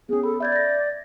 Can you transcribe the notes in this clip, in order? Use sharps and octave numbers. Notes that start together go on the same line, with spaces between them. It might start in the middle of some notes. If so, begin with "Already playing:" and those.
B3 C#4 G#4
A4 B5
D5 E5 G6 G#6
A6 A#6